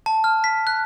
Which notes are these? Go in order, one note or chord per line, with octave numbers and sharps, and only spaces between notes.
A5
F6
B6
F#6